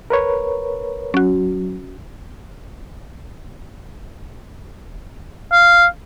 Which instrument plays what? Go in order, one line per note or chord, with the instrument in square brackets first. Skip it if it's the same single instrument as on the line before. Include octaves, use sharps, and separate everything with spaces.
[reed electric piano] A#4 B4 C#5
[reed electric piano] F#3 [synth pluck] C#4 F#4
[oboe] F5